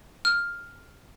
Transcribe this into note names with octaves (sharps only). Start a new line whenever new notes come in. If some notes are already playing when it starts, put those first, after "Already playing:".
F6